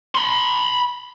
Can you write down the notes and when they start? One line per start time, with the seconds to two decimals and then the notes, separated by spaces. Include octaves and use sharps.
0.15 B5 C6